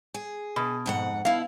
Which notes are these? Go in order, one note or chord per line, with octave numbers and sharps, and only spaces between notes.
G#4
B2
F2 G#2 F#5
B2 E4 F5